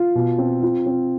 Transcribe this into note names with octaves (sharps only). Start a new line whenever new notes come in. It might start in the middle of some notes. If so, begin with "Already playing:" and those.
Already playing: F4
B2
C4
F4
C4